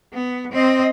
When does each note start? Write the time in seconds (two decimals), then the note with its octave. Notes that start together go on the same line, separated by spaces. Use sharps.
0.13 B3
0.53 C4 D#5